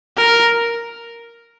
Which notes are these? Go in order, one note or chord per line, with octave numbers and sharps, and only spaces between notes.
A#4